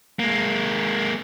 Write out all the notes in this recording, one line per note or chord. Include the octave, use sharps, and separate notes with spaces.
G#3 A#3